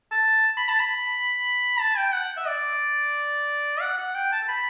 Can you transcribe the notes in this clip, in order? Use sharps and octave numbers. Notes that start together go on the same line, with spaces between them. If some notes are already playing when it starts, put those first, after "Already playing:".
A5
B5
A5
B5
A5
G5
F#5
E5
D5
F#5
F#5
G5
A5
A5
B5